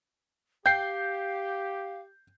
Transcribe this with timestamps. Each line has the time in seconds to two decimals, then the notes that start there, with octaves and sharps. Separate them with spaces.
0.66 G4 F5 G5 G6 C7